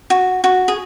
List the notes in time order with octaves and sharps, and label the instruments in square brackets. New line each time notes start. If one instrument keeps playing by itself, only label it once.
[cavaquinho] F#4
F#4
G#4